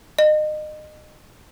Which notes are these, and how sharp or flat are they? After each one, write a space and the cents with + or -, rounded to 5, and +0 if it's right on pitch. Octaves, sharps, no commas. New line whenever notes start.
D#5 -30